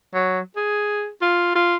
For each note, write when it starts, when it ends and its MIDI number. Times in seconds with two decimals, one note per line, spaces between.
0.14 0.40 54
0.56 1.08 68
1.22 1.53 65
1.55 1.76 65